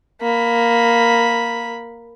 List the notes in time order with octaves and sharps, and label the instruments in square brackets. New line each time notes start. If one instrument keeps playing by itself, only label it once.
[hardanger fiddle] A#3 B5